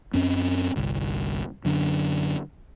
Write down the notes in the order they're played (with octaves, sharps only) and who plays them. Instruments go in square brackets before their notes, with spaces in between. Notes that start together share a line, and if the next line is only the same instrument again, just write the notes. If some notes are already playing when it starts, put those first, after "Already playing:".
[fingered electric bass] F#2 C4 C#4
G1 C2
F#2 D3